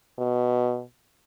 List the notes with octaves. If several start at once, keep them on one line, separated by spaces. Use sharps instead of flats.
B2